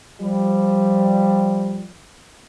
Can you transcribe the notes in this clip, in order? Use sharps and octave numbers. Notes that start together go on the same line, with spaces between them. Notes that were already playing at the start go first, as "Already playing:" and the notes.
F3 G3